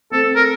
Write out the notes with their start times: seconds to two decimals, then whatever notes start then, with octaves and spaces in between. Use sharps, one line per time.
0.11 A3 C4 A4
0.36 A#4